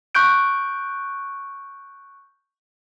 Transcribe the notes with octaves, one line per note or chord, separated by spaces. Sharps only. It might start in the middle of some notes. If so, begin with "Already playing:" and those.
C#6 F#6 G6 D7